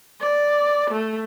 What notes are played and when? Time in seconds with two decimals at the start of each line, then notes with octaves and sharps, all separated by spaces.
0.20 D5
0.91 A3